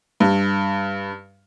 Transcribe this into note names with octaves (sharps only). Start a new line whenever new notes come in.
G2